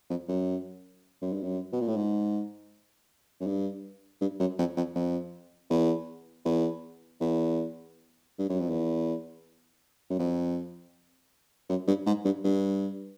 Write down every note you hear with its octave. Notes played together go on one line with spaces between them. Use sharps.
F2
F#2
F#2
G2
F#2
B2
A#2
A2
G#2
F#2
G2
G2
F#2
F2
F2
F2
E2
E2
E2
G2
F#2
F2
E2
F#2
F2
F#2
G2
G#2
G2
G2